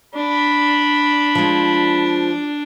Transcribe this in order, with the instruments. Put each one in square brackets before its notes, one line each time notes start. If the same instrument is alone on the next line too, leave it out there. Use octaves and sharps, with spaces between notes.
[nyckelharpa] D4 [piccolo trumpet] B5
[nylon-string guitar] F3 G#3